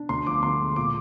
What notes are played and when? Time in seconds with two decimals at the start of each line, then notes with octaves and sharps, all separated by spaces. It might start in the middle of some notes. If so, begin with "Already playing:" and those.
Already playing: D4
0.09 D2 C6
0.27 F3 D6
0.43 D3 C6
0.60 G#3
0.76 A#2 D6